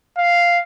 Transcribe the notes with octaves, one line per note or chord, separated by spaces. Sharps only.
F5